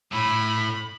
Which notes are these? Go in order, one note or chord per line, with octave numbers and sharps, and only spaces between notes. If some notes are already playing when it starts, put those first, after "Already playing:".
A2 B5